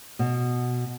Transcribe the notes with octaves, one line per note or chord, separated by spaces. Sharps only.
B2